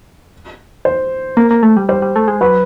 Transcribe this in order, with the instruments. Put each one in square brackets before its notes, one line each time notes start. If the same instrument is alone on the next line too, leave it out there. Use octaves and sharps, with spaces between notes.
[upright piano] C5
[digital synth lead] A#3
A#3
A3
G3
[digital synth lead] G3 [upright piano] C5
[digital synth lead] G3
A3
G#3
[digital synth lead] F#3 [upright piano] B4